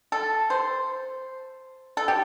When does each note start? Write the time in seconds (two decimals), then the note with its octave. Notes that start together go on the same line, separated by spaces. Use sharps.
0.12 A4
0.50 C5
1.97 A4
2.08 G4